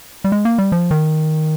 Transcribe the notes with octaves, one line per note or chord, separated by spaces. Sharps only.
G3
G#3
A#3
G3
F3
D#3